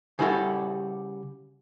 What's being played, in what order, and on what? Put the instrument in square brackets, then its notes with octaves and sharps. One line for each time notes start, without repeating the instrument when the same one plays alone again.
[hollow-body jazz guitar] C#3 G3 E4 F#4 A4